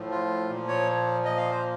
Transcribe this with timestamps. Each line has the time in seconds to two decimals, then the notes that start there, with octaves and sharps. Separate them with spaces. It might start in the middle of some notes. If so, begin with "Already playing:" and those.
Already playing: A2 F3
0.11 F4
0.49 A#2 F3
0.68 C#5
1.25 D#5
1.37 F5
1.51 C5